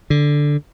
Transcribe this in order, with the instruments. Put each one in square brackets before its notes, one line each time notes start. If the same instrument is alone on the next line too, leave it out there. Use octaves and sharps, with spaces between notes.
[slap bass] D3